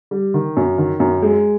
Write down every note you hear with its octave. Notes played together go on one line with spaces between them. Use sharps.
G3
D#3
F#2
D#3
F#2
G#3